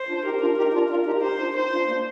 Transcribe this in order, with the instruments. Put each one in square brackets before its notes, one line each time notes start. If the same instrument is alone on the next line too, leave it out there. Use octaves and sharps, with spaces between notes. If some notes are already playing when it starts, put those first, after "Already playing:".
Already playing: [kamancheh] C5
[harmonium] D4 F4
[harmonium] D#4 G4 [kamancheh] A#4
[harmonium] D4 F4
D#4 G4
D4 F4
[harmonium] D4 F4 [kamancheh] A#4
[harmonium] D#4 G4
[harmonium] D#4 G4 [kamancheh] C5
[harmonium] D4 F4
[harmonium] C4 D#4 [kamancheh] C5
[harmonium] D4 F4
A#3 D4